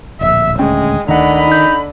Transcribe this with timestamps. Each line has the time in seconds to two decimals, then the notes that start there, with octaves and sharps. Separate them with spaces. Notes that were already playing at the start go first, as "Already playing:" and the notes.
0.21 D1 A#1 E5
0.59 D#1 D2 G#3 C#4 G5
1.09 D2 D3 D#3 D#5 F#5 A#5 B5
1.47 D#4 G6